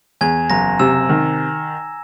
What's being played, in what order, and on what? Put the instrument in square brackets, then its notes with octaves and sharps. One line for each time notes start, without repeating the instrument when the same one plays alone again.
[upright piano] E2 [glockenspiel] G#5 G#6
[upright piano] F#1 [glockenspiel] A#5 A#6
[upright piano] C3 [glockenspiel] E6 E7
[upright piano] D#3